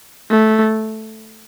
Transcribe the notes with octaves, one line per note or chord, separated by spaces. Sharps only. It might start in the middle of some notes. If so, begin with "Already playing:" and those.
A3